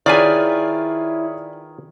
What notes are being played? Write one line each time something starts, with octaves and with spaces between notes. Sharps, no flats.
D#3 E4 F4 G#4 B4 C#5 D5 G#5